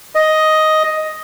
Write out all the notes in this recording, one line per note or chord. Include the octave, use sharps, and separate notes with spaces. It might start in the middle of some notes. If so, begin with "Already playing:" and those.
D#5